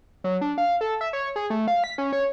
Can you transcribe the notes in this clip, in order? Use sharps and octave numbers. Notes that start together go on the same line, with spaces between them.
F#3
D4
F5
A4
E5
C#5
G#4
A3
F5
B6
C#4
C#5